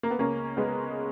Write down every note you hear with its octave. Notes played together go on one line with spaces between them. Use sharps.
A#3
B3
C#2 C#3 A#3 C#4
G#3 B3